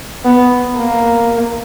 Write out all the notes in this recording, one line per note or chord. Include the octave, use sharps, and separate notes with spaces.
B3
A#3